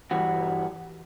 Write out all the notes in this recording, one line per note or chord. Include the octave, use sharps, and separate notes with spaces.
G2 E3 G3 F#4